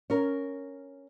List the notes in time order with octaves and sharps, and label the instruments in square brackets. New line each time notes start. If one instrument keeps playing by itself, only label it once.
[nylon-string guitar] C#4 A#4